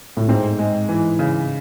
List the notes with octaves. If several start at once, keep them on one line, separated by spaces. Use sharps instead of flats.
A2
G#2 C4
G#3
E3
C#3